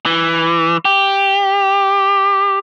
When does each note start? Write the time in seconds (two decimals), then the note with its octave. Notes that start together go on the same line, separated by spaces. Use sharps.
0.06 E3
0.85 G4